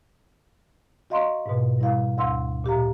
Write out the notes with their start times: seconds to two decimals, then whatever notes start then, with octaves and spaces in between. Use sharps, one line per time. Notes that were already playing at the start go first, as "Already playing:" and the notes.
1.10 F#4 D#5 F5 A#5 C6 C#6
1.46 G#2 B2
1.79 G3 E4 F5
2.18 D2 F5 C6 E6
2.64 A#2 G4 F5 A#5